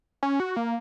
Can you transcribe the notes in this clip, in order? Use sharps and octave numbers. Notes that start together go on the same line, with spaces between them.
C#4
F#4
A#3